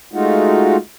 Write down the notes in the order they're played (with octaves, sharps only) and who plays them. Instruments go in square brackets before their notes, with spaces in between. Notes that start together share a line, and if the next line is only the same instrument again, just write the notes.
[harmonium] G#3 A3 D#4 F4 F#4